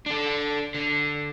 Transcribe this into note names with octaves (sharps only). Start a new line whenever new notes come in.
D4 A4
D3